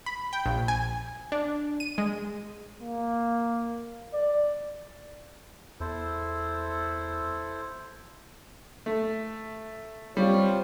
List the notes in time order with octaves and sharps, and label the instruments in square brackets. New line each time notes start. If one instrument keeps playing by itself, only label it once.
[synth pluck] B5
G5
A#1
G#5
D4
D#7
G#3
[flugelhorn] A#3
D5
[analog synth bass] E2 [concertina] E4 A4 C5
[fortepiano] A3
[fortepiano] G3 [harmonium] C4 F4 C#5